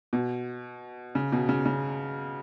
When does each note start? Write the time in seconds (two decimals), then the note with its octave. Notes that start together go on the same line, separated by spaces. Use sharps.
0.13 B2
1.15 C#3
1.32 B2
1.49 C#3
1.66 C#3